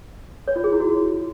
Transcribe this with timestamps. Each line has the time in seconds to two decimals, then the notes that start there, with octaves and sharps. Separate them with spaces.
0.48 C#5
0.56 F4
0.64 G#4
0.72 E4
0.80 F#4